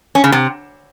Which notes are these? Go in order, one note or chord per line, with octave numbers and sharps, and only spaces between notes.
C#4
C#3
C3